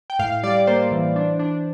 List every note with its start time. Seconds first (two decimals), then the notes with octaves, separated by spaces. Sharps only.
0.10 G5
0.19 A2 F5
0.43 G3 D5
0.67 A#3 C5
0.92 E3
1.16 D4
1.39 D4